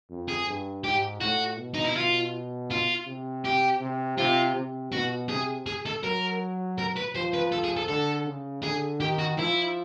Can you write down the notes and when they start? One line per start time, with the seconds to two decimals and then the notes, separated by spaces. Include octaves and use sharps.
0.10 F2
0.29 G#4
0.47 G2
0.84 G#2 G4
1.21 A2 F#4
1.58 B2
1.74 D#4
1.85 E4
1.96 B2 F4
2.70 F4
3.07 C3
3.45 G4
3.81 C3
4.18 C3 F4
4.56 C3
4.93 B2 F#4
5.29 C3 G#4
5.66 G#4
5.86 A4
6.03 F#3 A#4
6.78 A#4
6.96 B4
7.15 F3 C5
7.34 B4
7.52 A4
7.64 G#4
7.77 A4
7.89 D3 A4
8.26 C#3
8.63 D3 G#4
9.00 D#3 G4
9.18 F#4
9.38 F3 E4